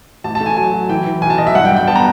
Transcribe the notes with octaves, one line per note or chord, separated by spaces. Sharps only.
A1 A5
A5
A3
G#5
F#3 G#5
F#3
E3 G5
E3
B1 G#5
A5
B1 D#5
E5
G2 F#5
G5
G2
G5
B3 A5
A#5